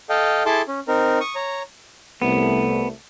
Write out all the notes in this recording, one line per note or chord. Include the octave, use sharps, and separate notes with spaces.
A4 D#5 F5 G5
E4 G#4 A4 A5 C6 D6
C#4
C4 D#4 A#4
C#6 D#6
C#5 A#5
C2 A3 B3